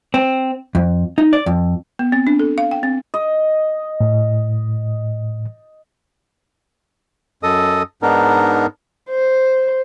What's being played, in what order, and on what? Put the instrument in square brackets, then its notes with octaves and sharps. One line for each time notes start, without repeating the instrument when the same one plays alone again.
[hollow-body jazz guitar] C4
F2
D#4
D5
F2
[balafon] B3
C4
D4
A4
F5
G5
C4
[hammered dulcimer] D#5
[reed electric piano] A2
[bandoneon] F#2 A4 D#5 D#6
G#2 B3 D4 D#4 A#4
[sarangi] C5